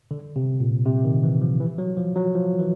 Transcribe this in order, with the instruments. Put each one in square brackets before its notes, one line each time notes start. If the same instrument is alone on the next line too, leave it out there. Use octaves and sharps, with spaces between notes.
[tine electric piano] D3
C3
A#2
C3
D#3
E3
F3
E3
F#3
F3
F#3
F3
E3